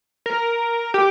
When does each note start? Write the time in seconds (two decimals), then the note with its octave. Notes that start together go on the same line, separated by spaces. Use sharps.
0.26 A#4
0.94 G4